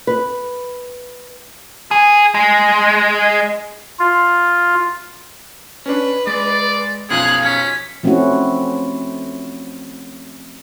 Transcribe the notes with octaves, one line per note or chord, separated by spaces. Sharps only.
B4
G#4
G#3
F4
C#4 D4 B4
G#3 D5
B1 F#2 F3 G#4 F5 F#6
C#4 B6
F3 A3 C4 C#4 E4 F#4